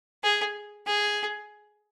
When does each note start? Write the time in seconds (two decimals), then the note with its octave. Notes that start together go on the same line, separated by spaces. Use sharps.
0.23 G#4
0.86 G#4